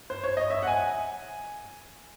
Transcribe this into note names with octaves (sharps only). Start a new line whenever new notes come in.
C5
C#5
D#5
E5
F#5
G#5